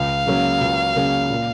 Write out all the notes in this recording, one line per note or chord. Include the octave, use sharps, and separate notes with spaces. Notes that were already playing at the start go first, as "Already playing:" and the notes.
Already playing: C#2 F5
C#3 F#3 A#3 C#4
C#2
C#3 F#3 A#3 C#4
A#2